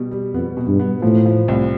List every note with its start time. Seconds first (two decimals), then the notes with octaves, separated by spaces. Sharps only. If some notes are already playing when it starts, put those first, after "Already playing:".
Already playing: B2 G3
0.11 G3
0.34 F2 B3
0.57 B2
0.68 G2
0.79 B3
1.02 A2 F3
1.26 F3
1.48 C2